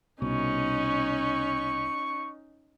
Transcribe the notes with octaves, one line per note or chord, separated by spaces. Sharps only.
C2 B2 C#4 D#4 C#6